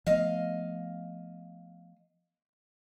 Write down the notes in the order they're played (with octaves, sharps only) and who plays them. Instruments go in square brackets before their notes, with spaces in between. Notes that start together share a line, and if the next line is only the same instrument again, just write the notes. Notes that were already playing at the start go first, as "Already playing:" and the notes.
[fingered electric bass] F3 A3 B3 [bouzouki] D#5 F5